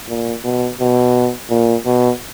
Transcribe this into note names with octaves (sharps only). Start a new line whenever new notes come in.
A#2
B2
B2
A#2
B2